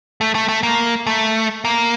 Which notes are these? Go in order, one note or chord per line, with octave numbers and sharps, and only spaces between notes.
A3
A3
A3
A#3
A3
A#3